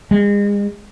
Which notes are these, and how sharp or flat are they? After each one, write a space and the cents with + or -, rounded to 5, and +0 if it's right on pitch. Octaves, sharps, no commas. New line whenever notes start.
G#3 -35